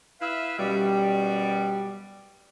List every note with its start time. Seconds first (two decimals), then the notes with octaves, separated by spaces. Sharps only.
0.21 E4 B4 E5 F5
0.59 F#2 B2 G3